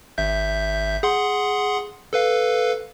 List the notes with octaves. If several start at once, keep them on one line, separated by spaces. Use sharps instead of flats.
G#1 E5 G6
G#4 F#5 C6
A4 B4 F5